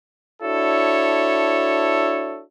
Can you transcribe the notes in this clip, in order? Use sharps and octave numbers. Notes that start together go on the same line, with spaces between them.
D4 E4 F#4 A4 C#5